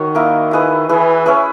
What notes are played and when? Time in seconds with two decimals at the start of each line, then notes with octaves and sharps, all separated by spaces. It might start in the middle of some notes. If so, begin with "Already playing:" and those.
Already playing: D#3 F#4 C#5
0.15 A#3 E4 A#4 D#5
0.51 E4 G#4 B4 D#5
0.88 E3 E4 G#4 B4
1.26 C#4 E4 G#4 B4